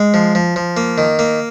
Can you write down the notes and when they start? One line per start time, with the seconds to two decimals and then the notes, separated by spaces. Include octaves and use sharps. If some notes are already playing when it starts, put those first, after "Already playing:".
Already playing: G#3
0.14 F3
0.35 F3
0.56 F3
0.77 A#3
0.98 D#3
1.19 A#3